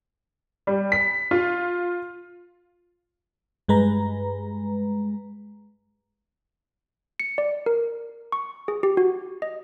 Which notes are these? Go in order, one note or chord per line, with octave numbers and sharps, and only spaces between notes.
G3
B6
F4
G2 G#3 B4 A#5
C#7
D5
A#4
C#6
G#4
G4
F#4
D#5